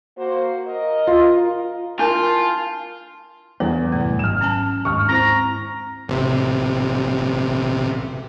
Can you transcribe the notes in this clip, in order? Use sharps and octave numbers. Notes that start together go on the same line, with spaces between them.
A#3 F#4 C5
A#4 D#5
F4
D4 E4 F4 A#4 A5
E2 G3 D4 A4
C2 F#2 A2 A3
G#1 F#3 F6 E7
C#4 G#5 A5
D#2 G#2 C#6 F6
C4 E4 C5 A#5
A1 C3